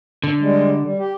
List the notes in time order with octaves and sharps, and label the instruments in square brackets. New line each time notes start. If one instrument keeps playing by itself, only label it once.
[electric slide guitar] D3
[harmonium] G3 G#3
G3
G4